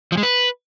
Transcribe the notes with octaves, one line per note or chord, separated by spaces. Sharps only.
F3
G#3
B4